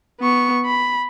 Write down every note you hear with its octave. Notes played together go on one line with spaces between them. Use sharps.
B3 C#6
B5